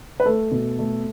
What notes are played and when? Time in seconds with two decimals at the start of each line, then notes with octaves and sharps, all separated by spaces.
0.20 B4
0.26 A3 A4
0.52 B2
0.79 A3